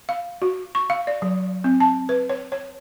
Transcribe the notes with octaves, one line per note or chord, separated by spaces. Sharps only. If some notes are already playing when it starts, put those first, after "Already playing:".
F5
F#4
C#6
F5
D5
F#3
C4
A5
B4
C#5
C#5